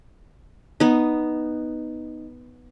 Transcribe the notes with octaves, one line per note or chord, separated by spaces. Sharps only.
B3 D#4